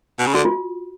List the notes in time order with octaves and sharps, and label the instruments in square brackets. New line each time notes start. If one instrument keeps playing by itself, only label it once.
[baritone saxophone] B2
C#3
[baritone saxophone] D3 [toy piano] F#4
[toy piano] F4